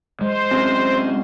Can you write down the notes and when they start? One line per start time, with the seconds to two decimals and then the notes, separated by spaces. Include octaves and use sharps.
0.21 G#3 C5
0.51 C3 F#3 C#4